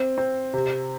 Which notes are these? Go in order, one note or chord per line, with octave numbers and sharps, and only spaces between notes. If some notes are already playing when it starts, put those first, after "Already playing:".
Already playing: C4
C4
C3